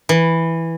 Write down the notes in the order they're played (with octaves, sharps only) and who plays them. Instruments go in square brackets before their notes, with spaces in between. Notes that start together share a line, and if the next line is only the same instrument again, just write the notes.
[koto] E3